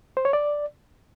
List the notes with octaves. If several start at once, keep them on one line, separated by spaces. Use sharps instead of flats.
C5
C#5
D5